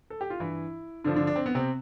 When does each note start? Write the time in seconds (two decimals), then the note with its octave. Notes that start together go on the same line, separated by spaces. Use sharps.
0.10 A4
0.21 G4
0.30 F4
0.40 G2 E3 E4
1.04 G2 D3 F3 D4
1.16 D3 D4
1.27 D4
1.36 C4
1.46 B3
1.55 C3 C4